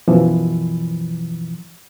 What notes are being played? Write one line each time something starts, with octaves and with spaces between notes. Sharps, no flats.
F#2 B2 E3 F3